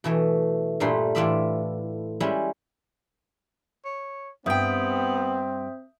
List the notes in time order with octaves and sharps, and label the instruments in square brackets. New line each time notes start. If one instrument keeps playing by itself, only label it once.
[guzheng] B2 E3 A3
G2 A#2 G3 A3 C6
A2 E3 F4 D5 E5 B5
G3 G#3 C#4 E4
[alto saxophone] C#5
[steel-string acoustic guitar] G2 G5 [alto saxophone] B3 [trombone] C4 [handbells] E5 D#6 G6